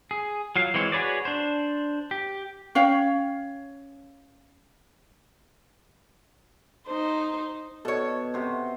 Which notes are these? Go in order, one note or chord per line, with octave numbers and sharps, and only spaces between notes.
G#4
F#3 F4 F5
E3 G#3 C4 C5 C#5
F#4 G#4 B4 C#5 D5
D4 C5
G4
C#4 C#5 F5 G5
D#4 C5
B2 A4 C#5 C#6
C3 F#4 C5